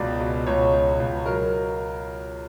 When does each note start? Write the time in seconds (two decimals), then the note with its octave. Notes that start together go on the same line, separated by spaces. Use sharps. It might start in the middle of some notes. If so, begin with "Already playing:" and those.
Already playing: C#2 B2 D5
0.20 B2
0.47 C#2 C#5
0.73 C#2
1.00 C#2
1.26 F#3 A#4